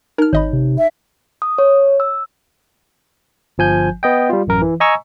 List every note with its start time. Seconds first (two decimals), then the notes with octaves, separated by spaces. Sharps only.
0.18 D#4 A#4 F6
0.33 G#1 C#5 D#5 B5
0.53 C3
0.76 E5
1.42 D#6
1.58 C#5
2.00 E6
3.58 G1 F3 G#5 G6
4.03 B3 D#5 G5
4.30 G3 F4
4.47 A1 F#2 A#4
4.62 E3
4.80 D#5 G#5 A#5 C#6 E6